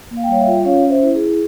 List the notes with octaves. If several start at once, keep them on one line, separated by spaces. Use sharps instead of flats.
A#3
F5
G5
G3 C#5 F5
E5 G5
F4
C#4 C#5 F5
C#4
C5 E5
E4
G#4
E4